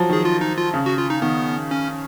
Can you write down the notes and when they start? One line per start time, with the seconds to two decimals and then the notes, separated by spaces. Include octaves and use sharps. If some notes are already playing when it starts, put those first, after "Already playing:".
Already playing: F3 F#3
0.10 D#3 G#4
0.25 F4
0.41 D#4
0.58 F4
0.74 C#3
0.86 F#4
0.98 F4
1.10 D#4
1.22 D#3 B3
1.71 C#4